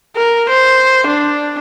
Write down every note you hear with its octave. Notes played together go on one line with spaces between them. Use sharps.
A#4
C5
D4